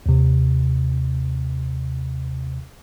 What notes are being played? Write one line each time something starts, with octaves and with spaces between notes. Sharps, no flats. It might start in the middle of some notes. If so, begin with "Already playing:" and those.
D#2 C3